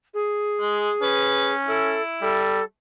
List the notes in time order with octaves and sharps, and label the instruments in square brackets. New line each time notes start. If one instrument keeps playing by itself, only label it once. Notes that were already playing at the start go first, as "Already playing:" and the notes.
[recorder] G#4
[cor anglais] G#3
[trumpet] C#4 [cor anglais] B4
[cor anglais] E4 [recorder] A4
[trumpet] G3 [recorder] A4